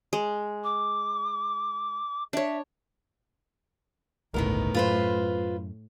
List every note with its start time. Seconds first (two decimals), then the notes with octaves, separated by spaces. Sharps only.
0.13 G#3
0.64 D6
2.33 D4 C#5 E5
4.34 G1 C#2 A2 D#3 B3 A#4
4.74 F#2 F4 B4 C5